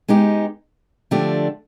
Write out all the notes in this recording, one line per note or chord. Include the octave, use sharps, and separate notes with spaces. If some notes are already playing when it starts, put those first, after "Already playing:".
G#3 B3 D#4 G4
D3 F3 A3 D4 G4